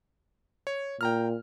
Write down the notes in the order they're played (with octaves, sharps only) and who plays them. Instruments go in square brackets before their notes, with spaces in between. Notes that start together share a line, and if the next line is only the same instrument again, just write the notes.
[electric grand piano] C#5
[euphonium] A#2 [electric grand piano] G5 A#5 F6